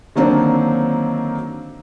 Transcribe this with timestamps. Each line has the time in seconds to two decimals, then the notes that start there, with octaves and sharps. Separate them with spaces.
0.16 D3 D#3 F#3 A#3 C4 D4